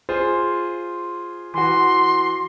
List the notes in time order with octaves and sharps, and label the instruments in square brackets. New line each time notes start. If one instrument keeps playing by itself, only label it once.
[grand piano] F4 G#4 C5
[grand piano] E3 F#4 [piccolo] C6